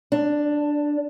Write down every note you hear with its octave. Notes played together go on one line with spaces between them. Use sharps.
D4